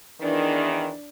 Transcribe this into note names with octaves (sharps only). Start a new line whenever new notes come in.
E2 D#3 E3 D4